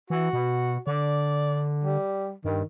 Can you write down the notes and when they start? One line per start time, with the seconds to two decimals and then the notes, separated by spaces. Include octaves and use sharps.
0.10 E3 F#4
0.33 B2
0.87 D3 D5
1.84 G3
2.45 G2 D#3